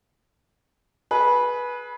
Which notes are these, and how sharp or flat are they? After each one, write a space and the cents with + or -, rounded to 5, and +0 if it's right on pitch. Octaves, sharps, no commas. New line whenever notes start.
G#4 +25 B4 -15